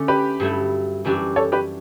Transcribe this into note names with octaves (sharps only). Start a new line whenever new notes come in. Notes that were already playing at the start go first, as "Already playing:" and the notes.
Already playing: D3 A3 C#4
G4 B4
G2 F#3 A3 E4
F#2 E3 G3 D4 F#4
A4 C#5
G4 B4